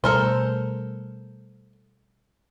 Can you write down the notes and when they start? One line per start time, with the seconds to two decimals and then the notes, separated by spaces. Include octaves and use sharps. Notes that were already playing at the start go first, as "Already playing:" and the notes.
0.04 B2 G3 A3 A4 A#4 C5